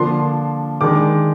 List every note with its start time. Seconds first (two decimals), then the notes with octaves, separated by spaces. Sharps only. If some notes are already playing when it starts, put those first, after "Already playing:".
Already playing: D3 F3 A#3 D4 C6
0.81 D#3 G#3 D4 D6